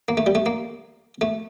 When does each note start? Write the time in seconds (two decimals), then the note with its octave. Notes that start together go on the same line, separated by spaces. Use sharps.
0.09 A#3
0.17 A3
0.26 G3
0.35 A3
0.46 A#3
1.21 A3